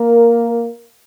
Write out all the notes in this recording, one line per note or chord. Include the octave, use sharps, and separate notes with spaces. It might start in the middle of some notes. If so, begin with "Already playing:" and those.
Already playing: A#3 A#4